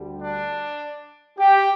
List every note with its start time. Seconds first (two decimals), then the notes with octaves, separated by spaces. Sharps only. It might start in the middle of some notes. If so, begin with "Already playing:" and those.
Already playing: D2 D3 G3
0.21 D4
1.38 G4